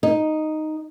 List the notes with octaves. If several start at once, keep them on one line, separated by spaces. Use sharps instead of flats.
D#4